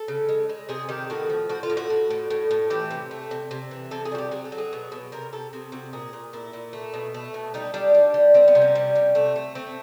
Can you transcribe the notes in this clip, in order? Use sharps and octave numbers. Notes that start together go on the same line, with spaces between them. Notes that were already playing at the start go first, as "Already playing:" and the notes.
Already playing: A4
C#3
G#3
G#3
C3 G#4
D#3 G4
A2 F#4
F3
A2 F#4
F4
A2
F#4
A2
A2
A2
A2
E3 G4
C3
A3
C3
C3
E3
C3 A4
G#4
G3 F#4
G4
F#3 G#4
A4
F#3
G#4
B2
B2
C3 A#4
C3 A4
C3 G#4
C3 F#4
A#2 G#4
A#2
A#2 E4
A#2
A3
B2
A3
B2
G3 D#4
G3 D4
G3
G3
G3 C4
B3
C3
C#4
G3
C3
A3
A3
A3 C4